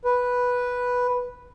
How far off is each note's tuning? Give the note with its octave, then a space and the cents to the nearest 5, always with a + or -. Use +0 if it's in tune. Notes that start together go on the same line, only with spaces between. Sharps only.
B4 -5